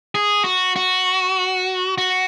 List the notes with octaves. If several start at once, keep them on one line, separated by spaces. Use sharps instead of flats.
G#4
F#4
F#4
F#4